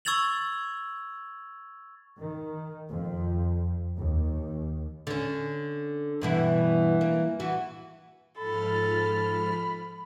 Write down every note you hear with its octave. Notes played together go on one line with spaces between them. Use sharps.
C#6 E6 G#6 A6 F7 F#7
D#3
F2
D#2
D3 C#4
G2 B2 E3 E4
A#3
E3 F#4
G#2 F3 A4 B5 F6